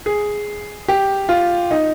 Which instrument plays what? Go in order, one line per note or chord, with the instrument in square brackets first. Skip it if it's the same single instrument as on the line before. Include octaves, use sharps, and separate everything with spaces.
[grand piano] G#4
G4
F4
D#4